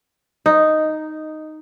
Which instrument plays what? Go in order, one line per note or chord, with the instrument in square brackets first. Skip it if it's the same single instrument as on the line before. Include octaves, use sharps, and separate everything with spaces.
[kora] D#4